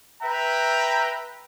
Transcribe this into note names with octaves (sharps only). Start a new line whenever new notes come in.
B4 E5 G5 A#5